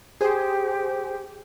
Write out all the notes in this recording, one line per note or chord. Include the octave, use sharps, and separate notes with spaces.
G4 G#4 C5